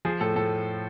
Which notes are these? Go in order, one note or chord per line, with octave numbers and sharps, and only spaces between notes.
F3 G#4
A2 A4
A2 A4